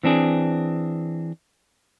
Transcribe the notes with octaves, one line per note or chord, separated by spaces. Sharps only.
E3 C4 D4 G#4